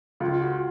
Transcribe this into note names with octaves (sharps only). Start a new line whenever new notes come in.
C#2 F4
F#4